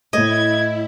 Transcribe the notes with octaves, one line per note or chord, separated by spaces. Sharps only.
A2 A3 E4 D#5 G#6